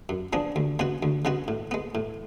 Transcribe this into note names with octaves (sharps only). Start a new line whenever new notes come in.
F#2
F3 B3 D4 G#4
D2
C#3 G#3 B3 F#4
D2
C#3 G#3 B3 F#4
A2
G#3 B3
A2